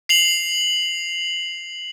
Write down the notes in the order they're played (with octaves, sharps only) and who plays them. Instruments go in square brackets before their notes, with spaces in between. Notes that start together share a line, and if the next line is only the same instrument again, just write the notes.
[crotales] C7 F7 F#7